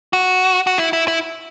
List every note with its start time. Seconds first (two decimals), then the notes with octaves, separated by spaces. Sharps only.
0.13 F#4
0.67 F#4
0.78 E4
0.93 E4
1.08 E4